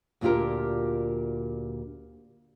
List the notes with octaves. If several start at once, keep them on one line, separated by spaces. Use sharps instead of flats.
D2 A#2 D4 F4 G4 A#4